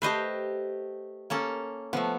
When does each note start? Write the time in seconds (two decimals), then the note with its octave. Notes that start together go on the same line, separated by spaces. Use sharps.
0.02 A3 G4 B4 C5 D#5
1.30 A#3 C#4 A4
1.93 F3 A3 B3